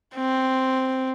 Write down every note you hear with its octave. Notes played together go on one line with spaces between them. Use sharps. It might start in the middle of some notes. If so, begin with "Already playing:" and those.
C4